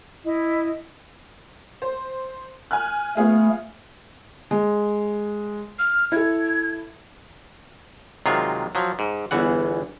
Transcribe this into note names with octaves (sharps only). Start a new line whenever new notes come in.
E4 D#5
C5
G#5 F6 F#6
A3 B3 F4 G#4
G#3
F6
E4 A4 G#6
C3 D#3 F#3 G#3 F4
F3 F#3
G#2
G1 E2 E3 F#5